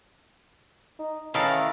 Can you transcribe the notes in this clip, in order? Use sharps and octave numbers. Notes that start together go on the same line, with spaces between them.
D#4
A2 D#3 E3 C#4 A4 A#4 F5